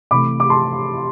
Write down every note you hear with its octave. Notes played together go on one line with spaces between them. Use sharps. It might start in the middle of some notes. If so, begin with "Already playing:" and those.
C3 E3 A3 B5 D6
D6
A5 C6